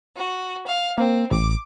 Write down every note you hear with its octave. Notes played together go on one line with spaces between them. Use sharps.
F#4
F5
A#3 C4
A1 D6